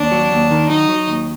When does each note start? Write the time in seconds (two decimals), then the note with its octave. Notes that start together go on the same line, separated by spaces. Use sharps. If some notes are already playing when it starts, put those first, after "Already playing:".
Already playing: D#2 D4
0.12 F#3
0.31 D#2
0.51 D#3
0.69 F#3 D#4
0.89 F#3
1.07 D#2